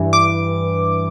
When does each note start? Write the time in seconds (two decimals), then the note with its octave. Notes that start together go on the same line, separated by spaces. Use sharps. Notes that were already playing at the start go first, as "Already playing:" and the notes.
Already playing: G2 E3
0.13 D6